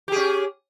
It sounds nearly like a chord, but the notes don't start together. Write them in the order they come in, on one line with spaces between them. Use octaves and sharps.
G4 G#4 C#4